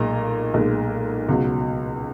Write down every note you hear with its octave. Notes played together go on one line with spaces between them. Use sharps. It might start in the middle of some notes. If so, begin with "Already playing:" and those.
Already playing: B1 A#2 G#3 A#5
B1 A#2 G#3
C#2 B2 F#3